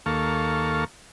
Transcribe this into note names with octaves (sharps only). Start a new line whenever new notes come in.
D#2 A#3 A4 F5 C#6